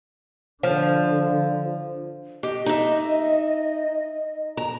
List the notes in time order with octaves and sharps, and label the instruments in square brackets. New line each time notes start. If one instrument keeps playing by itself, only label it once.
[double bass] D3 [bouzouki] F3
[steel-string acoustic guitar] G4 [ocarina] D#5
[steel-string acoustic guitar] D#4 E5
A#5